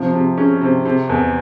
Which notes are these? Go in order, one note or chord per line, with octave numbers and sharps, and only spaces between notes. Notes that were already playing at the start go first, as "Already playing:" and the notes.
Already playing: C3 F3
C3
C#4
C3
C3
E2